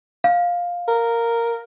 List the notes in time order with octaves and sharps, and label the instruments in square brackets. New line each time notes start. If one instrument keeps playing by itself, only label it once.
[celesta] F5
[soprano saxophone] A#4